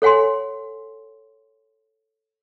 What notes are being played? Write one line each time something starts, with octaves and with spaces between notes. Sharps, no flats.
A4 C#5 F#5 G#5 C6